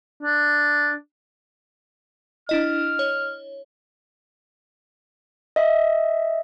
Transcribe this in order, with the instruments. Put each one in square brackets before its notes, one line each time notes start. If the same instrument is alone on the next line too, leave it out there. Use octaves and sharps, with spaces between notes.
[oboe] D4
[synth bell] D4 E4 D#5 [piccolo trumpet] F6
[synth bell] C#5
[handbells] D#5 E5